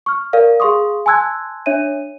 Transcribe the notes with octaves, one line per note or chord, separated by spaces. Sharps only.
C#6 F6
A#4 D5 F5
G#4 F5 C6 C#6 D#6
G#5 A5 C6 E6 F#6 G#6
D4 C#5 E5 D#7